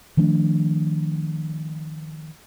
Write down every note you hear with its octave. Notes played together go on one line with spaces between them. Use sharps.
D#3 F3 A3 D4